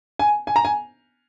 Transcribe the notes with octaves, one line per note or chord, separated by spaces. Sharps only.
G#5
G#5
A#5
G#5